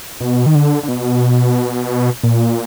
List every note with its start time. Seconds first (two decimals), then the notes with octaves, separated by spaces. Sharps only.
0.21 B2
0.46 D#3
0.55 D3
0.83 D3
0.88 B2
2.23 A#2